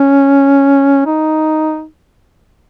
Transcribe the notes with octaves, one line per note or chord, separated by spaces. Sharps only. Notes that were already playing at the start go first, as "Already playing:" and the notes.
Already playing: C#4
D#4